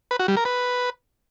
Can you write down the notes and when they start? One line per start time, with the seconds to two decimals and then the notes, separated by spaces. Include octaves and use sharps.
0.11 B4
0.19 F#4
0.28 G3
0.37 A#4
0.45 B4